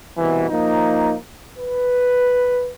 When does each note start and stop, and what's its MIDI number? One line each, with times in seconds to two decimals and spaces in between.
0.18 0.49 36
0.18 0.49 47
0.18 0.49 52
0.50 1.15 53
0.50 1.15 58
0.50 1.15 63
1.58 2.71 71